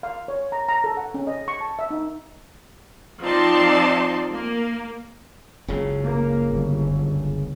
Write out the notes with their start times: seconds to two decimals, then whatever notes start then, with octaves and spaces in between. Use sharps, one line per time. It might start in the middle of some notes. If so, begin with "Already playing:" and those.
0.03 F5
0.28 C#5
0.52 A#5
0.69 A#5
0.84 A4
0.97 F#5
1.14 C#4
1.27 D#5
1.48 C#6
1.61 A5
1.79 E5
1.91 D#4
3.22 F3 C4 D#4 D5 A5 C6
4.32 A#3
5.68 F#1 C#2 C#3
6.02 A#3
6.50 G1